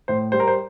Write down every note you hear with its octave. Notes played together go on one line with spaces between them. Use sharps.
A2 C5
G3 C5
A#4
C5